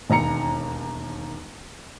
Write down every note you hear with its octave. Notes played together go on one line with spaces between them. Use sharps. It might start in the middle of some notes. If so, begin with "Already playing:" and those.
E1 D#2 A#5 C#7